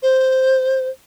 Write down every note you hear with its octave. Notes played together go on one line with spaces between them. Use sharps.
C5